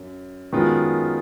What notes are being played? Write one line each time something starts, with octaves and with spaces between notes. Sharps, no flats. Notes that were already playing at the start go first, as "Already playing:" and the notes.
Already playing: F#2
F#2 D#3 G#3 B3 F4